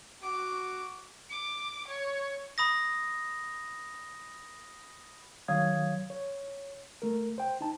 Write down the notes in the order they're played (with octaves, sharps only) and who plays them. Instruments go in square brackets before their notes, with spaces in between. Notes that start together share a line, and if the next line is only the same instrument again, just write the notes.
[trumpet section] F#4 [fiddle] D6
[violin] D6
C#5
[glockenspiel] B5 D#6 A#6
[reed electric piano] D#3 F#3 C#5 F5 D#6 G#6
C#5
A3 A#4
C5 G5
D#4 A5